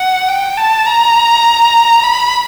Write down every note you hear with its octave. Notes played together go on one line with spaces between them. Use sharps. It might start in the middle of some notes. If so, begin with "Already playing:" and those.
Already playing: F#5
G5
A5
A#5
B5